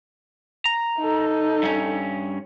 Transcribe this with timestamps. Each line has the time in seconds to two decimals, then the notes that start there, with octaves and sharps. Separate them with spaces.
0.66 A#5
0.98 D#4 A4
1.63 G2 C#4